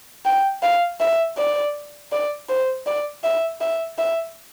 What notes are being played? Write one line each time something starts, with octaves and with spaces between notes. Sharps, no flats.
G5
F5
E5
D5
D5
C5
D5
E5
E5
E5